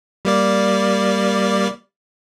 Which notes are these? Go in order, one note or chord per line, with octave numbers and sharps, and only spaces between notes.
G3 A#3 D5